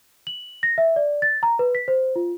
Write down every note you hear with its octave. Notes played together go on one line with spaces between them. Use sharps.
F#7
A#6
E5
D5
A6
A#5
B4
B6
C5
F4